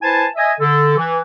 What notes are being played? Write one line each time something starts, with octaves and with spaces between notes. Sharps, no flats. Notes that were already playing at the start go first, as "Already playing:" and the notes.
E4 B4 C5 G#5 A5
D#5 E5 G#5
D3 A4
E3